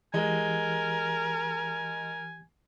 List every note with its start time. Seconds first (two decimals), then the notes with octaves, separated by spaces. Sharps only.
0.14 E3 G#3 G4 A#4 G#5